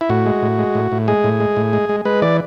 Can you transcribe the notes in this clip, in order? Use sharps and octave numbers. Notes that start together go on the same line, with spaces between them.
E4
A2 F#4
G#3
A2
G#3
A2
A2
G#3 G#4
A2
G#3
A2
G#3
G#3
G#3 B4
E3 D5